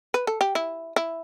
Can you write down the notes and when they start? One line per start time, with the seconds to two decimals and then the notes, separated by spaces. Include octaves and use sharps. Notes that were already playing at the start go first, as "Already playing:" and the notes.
0.14 B4
0.27 A4
0.41 G4
0.55 E4
0.96 E4